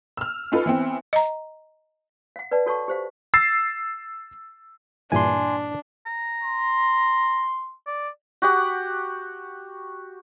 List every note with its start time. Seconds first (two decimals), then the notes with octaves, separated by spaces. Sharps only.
0.17 E6 F6
0.52 C#4 D#4 F4 A4 B4
0.66 E3 B3 C4
1.13 D#5 A#5
2.36 F5 F#5
2.51 B4 D5 F#5 A5
2.66 F#4 A4 C#5 F#5 A5 C#6
2.88 G4 C5 F5
3.34 E6 A6 C7
5.12 G2 A#2 E3 D4 G#5 C6
6.06 A#5
6.43 C6
7.87 D5
8.42 F#4 G4 F#5